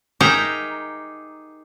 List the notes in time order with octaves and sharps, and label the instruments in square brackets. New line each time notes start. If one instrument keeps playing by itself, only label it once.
[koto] D#4 G4 G#4 A#4 E5 A#5